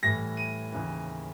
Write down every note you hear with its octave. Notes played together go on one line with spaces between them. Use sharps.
A2 E3 G3 A#6
D#7
D#2 C#3 E3